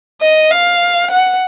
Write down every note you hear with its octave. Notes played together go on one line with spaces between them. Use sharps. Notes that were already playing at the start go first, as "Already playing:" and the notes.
D#5
F5
F#5